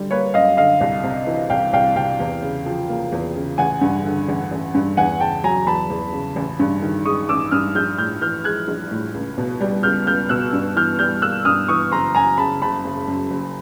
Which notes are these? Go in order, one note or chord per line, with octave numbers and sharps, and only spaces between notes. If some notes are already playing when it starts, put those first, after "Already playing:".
Already playing: D3 G3
A#3 B4 C#5
F#2 D#5 F5
D3 D#5 F5
C2
C3
E3
C2 F5 G5
C2 F5 G5
C3 F5 G5
E2
C#3
F3
A#3
E2
C#3
A1 F#5 G#5
G2
D3
A1
A1
G2
E2 F#5 G#5
C#3 G5 A5
F#3 G#5 A#5
E2 A5 B5
E2
C#3
A1
G2
D#3
G#3 C#6 D#6
A1 D6 E6
G2 D#6 F6
A#1 F6 G6
A2 F6 G6
E3 F6 G6
G#3 F#6 G#6
A#1
A2
C#2
B2
G3
C#2 F6 G6
C#2 F6 G6
B2 E6 F#6
G2
E3 F6 G6
G3 F6 G6
A#3 E6 F#6
G2 D#6 F6
E3 C#6 D#6
F#1 A#5 C6
F#2 G#5 A#5
C#3 A5 B5
F#1 A5 B5
F#1
F#2
F#1